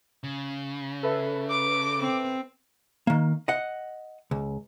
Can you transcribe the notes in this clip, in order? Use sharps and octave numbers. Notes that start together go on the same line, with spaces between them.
C#3
A4 B4 E5
D6
C4
D#3 A#3
D#5 F#5
C#2